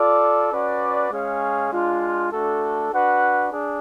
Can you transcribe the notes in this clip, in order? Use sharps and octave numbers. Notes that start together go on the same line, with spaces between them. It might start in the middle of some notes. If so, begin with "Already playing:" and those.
Already playing: F4 A4 D5
C#4 F#4 B4 D5
G#3 C#4 G#4 C#5 F5
G#3 D4 F4
A3 D4 F#4 A4
D4 F#4 B4 F#5
D4 G#4